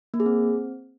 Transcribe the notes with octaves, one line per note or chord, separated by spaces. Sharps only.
A#3
G#4
C4